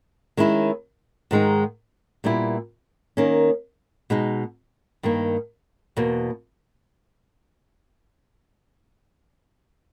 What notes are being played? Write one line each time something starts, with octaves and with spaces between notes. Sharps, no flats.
D#3 G#3 C#4 E4
G#2 D#3 G#3 D#4
A#2 G3 B3 E4
D#3 A#3 C#4
B2 G#3 D#4
G2 D#3 A#3
E2 B2 A#3